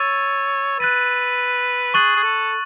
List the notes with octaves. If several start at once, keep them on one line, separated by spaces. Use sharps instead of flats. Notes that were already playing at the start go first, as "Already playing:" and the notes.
Already playing: C#5 E6 A6 D#7
B4 F#6 A6 D#7
G#4 C#6 F#6 A6 D#7 F#7
G#4
A4